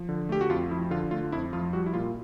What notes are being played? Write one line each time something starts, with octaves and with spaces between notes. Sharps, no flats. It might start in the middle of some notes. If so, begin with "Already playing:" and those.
Already playing: F3
D3
A3 G4
F#4
F2 F4
F3 E4
D3 F4
A3 F4
F2 E4
F3 F4
G3 F#4
E4
A#2 F4